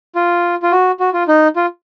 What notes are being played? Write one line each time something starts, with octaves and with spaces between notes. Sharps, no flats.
F4
F4
F#4
F#4
F4
D#4
F4